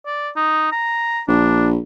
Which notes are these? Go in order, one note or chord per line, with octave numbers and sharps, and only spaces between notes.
D5
D#4
A#5
A#1 D4